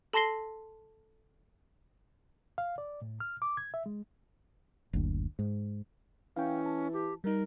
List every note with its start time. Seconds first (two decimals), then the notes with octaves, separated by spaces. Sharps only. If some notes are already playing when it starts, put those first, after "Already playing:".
0.13 A4 A5 C6 A#6 C7 G7
2.58 F5
2.78 D5
3.02 A2
3.20 F6
3.42 D6
3.57 G#6
3.74 E5
3.86 G#3
4.93 F#1 D2
5.39 G#2
6.36 E3 C#4 F5 G5
6.66 A5
6.93 G4
7.24 G3 D#4 A#4